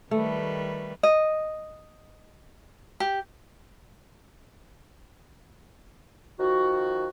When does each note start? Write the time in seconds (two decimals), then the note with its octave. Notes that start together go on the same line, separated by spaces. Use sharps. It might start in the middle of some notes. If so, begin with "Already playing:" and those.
0.11 D#3 G3 A3 B4
1.03 D#5
3.00 G4
6.39 D#3 F3 F#4